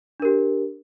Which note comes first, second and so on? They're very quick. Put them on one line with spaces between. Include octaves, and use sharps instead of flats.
D4 A#4 G4